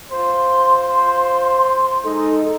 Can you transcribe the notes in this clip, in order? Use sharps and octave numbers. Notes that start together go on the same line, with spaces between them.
F4 C5 C6
G#3 D#4 A4